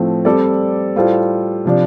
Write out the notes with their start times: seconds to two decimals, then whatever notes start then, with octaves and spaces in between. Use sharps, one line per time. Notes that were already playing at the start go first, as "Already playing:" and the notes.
Already playing: A2 F3 A3 C4
0.25 G3 C4 A4 D5
0.96 A2 G3 F4 A4 C5
1.65 C3 F3 D4